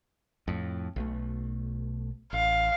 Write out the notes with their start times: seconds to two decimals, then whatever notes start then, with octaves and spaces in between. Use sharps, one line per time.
0.48 F2 A2
0.96 B1 B2 A3
2.33 A1 F5